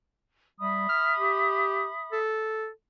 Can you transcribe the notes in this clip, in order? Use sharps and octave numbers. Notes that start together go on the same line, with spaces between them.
G3 E5 B5 D#6
F6
G4
A4